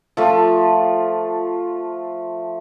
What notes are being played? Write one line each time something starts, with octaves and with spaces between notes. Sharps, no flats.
F3 A3 F4